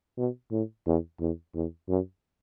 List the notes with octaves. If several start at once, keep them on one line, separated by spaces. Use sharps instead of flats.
B2
A2
E2
E2
E2
F#2